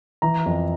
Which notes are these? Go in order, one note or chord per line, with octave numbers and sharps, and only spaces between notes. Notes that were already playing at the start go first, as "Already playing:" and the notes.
E3 A#5
F2